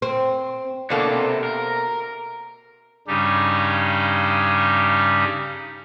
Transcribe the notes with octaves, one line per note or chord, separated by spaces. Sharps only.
C4
B2 A#3 D4 A4 C#5
C3
A#4
G2 C#3 G3 C#4 D#4 G4